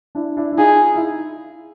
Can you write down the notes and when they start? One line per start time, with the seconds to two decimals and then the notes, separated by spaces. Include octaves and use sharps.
0.15 D4 E4
0.37 D4 E4
0.52 E4
0.58 D#4 F4 G#4
0.96 E4